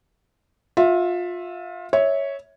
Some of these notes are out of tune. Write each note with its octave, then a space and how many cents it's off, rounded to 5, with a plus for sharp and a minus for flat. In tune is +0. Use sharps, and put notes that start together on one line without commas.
F4 +25 E5 +0
C#5 +0 E5 -20